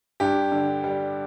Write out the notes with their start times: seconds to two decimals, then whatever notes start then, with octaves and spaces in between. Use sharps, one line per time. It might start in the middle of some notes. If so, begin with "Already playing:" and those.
0.20 G2 G4
0.52 D3
0.84 G3